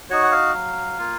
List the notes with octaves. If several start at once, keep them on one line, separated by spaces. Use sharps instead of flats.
D#4 F#4 C#5
F#5
F5
F#3
A#3 F4